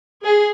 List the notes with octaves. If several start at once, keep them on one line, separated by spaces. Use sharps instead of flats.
G#4